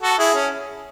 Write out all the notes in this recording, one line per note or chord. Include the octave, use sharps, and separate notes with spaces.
F#4 A4
E4 G#4
C#4